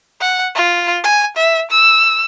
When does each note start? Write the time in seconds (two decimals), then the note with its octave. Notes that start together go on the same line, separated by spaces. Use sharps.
0.21 F#5
0.55 F4
1.04 G#5
1.37 E5
1.71 E6